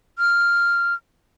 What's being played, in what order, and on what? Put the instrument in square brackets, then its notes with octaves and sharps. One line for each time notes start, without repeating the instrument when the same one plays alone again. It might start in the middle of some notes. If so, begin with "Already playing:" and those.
[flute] F6